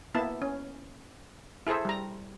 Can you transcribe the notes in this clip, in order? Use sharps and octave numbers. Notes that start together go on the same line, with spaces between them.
A#3 B3 E4 A5
C#4
E4 G#4 A4 C5 E5
G3 A#5